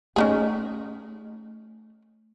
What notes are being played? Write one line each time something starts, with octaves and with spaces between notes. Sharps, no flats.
A3 C#4 D#4 G#4